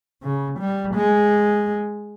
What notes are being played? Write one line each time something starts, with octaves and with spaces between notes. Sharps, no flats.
C#3
G3
G#3